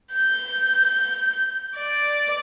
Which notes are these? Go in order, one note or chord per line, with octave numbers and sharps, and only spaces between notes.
G6
D5